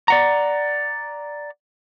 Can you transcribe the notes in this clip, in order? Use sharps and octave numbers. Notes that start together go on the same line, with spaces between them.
D5 F#5 A#5